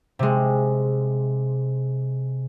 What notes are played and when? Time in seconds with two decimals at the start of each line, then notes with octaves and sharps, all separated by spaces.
0.19 C3 G#3